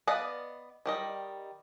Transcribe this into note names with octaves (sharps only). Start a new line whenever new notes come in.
B3 D5 D#5 F5 F#5
D#3 G3 D#5